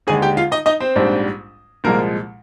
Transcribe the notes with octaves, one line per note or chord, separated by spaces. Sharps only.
D#2 D3 G#3 G#4 G#5
G4 G5
F4 F5
D#4 D#5
D#4 D#5
C4 C5
A#1 G#2 G3 D4
C2 A#2 F3 G#3 A#3 A#4